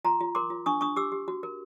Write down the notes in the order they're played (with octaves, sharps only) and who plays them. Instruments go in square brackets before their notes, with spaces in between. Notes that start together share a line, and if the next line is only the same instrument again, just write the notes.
[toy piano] F4 A#5 C6
F4
A#4 C6 D6
F4
D4 C#6 D#6
D4 C#6 D#6
G4 D6 E6
G4
F#4
A#4